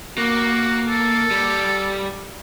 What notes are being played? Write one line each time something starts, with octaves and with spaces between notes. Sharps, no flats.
A#3 F#4
A4
G3